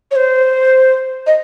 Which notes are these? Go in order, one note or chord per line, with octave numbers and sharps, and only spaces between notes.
C#5
C5
D#5